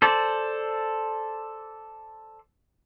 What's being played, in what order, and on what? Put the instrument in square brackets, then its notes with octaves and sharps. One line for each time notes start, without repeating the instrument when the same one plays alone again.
[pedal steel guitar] A4 C5 D5